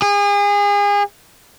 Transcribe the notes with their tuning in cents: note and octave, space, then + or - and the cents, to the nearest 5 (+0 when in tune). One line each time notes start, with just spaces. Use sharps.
G#4 -35